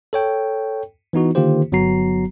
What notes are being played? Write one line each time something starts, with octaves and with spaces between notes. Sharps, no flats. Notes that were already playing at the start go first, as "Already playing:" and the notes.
A4 C#5 G5
E3 B3 D#4 F#4
D3 D#3 A#3 F4 G4 C5
G1 F#3 B3 F#4 A#5 C7